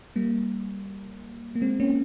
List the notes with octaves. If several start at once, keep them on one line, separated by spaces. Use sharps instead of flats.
G3 A#3
A#3
G#3 C4
A#3 C#4